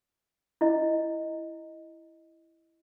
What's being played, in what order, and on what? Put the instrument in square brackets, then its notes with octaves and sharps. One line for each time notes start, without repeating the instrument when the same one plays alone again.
[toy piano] E4 D#5